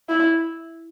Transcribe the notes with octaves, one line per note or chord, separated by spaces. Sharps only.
E4